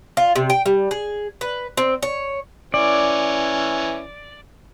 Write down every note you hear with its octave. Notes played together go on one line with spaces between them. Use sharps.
F4
C3
G5
G3
G#4
B4
C4
C#5
E3 C#4 D5